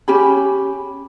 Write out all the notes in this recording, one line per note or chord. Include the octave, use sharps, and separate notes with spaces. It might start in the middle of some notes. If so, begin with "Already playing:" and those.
C#4 G4 B5